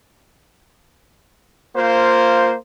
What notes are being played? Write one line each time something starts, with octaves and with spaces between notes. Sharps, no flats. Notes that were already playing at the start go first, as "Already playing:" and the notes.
A#3 F4 C5